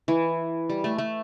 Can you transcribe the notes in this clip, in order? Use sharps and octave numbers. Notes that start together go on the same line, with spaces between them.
E3
G3
A3
A3